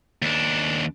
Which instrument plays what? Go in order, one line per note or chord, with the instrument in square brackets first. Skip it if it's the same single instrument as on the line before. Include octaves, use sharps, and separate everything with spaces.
[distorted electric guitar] D#2 D4